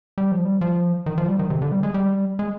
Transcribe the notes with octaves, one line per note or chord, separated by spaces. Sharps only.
G3
F3
G3
F3
D#3
F3
G3
D#3
C3
D3
G3
G#3
G3
G#3